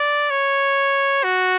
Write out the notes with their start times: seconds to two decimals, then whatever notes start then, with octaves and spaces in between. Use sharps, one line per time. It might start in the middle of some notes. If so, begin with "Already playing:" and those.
Already playing: D5
0.31 C#5
1.24 F#4